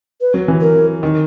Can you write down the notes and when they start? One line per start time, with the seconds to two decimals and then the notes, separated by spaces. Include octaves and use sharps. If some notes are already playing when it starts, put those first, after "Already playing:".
0.21 B4
0.34 F#3
0.48 E3
0.61 A#4
1.03 D#3